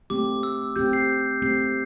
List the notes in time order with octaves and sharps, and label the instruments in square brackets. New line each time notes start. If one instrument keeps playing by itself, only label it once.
[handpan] A3 C4 G4 [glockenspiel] D6
[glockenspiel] E6
[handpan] A3 C4 G4 [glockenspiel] G6
[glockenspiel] C7
G6
[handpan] A3 C4 G4 [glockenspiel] C7